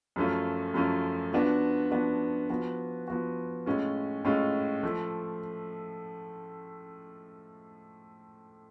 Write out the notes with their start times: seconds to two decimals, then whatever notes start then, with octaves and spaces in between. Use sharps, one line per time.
0.16 F#2 F3 A3 C#4 F4
0.74 F#2 F3 A3 C#4 F4
1.33 F3 B3 D4 F#4
1.91 F3 B3 D4 F#4
2.50 F3 B3 F#4
3.08 F3 B3 F#4
3.66 A2 G#3 C#4 F4
4.25 A2 G#3 C#4 F4
4.83 F3 A3